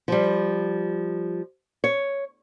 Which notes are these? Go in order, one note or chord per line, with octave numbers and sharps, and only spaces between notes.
F3 G3
C#5